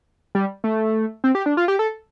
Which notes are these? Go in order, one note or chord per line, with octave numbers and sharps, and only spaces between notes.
G3
A3
C4
G4
D4
F4
G4
A4